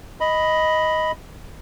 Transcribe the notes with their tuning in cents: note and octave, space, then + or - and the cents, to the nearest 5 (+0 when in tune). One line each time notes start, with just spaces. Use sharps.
D#5 +10 B5 +0